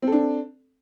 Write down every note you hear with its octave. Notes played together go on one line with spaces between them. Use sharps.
C4 D4 A4